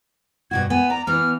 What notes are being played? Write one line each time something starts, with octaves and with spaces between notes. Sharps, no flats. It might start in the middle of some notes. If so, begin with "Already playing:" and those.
G2 B2 F#4 G#6
B3 G#5
D5 A#5
E3 B3 F6